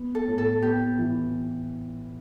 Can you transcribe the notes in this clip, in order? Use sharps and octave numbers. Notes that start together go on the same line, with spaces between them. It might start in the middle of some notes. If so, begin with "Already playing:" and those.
Already playing: B3
A4
A2
A4
B3 G4
E3